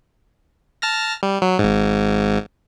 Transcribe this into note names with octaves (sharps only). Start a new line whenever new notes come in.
A5 F6 A#6
G3
F#3
G#1 G#2